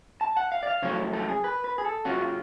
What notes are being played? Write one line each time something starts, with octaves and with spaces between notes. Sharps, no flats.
A5
F#5
F5
D5
F5
F#2 C#3 F#3 A3 C#5
A4
G#4
B4
B4
G#4
A4
C#3 F#3 C#4 F4 F#4
F4